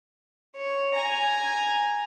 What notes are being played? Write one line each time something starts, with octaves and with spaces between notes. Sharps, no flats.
C#5
G#5 A#5